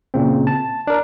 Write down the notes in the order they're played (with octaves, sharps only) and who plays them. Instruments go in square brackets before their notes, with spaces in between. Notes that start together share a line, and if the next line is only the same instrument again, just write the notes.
[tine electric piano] A#2 C#3 C4
A5
D4 A#4